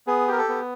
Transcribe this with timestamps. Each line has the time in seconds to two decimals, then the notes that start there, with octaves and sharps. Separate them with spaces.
0.07 B3 G#4
0.28 G4 A#4
0.38 A4
0.49 B3